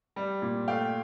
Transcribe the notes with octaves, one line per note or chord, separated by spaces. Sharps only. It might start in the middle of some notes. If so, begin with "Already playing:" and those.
G3
A#2
A3 F5 G5